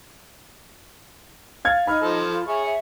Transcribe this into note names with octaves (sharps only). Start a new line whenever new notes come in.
F5 G#6 A6
D#4 B5 F6
F3 A4 C5
F4
G#4 C#5 E5 C#6
E5